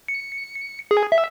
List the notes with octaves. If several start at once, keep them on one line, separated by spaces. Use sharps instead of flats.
C#7
G#4
E5